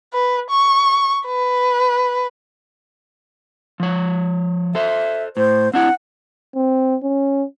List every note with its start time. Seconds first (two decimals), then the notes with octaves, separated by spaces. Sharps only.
0.13 B4
0.50 C#6
1.27 B4
3.80 F3 C#5
4.75 A4 C5 E5
5.37 A2 C5
5.73 C4 D4 E4 F#5
6.56 C4
7.03 C#4